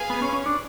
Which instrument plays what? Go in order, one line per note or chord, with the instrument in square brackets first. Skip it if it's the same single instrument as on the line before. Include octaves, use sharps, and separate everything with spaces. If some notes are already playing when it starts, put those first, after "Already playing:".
Already playing: [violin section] G#4 B4 F5 G#5
[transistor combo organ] B3
C#4
C#4
D4